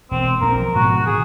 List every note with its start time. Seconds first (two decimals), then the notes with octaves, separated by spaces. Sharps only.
0.11 E1 C4
0.41 D#1 A#1 C4 A#4
0.59 F3
0.75 G#2 B2 F#4
1.06 D#3 G#4